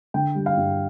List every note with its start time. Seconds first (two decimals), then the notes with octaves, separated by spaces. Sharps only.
0.14 D3 G5
0.35 G3
0.46 F5
0.57 G2